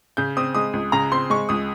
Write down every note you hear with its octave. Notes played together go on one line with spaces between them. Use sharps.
C#3 G6
C4 D#6
G#3 D#6
C#2
C#3 A#5
C4 C6
G#3 C#6
C#2 D#6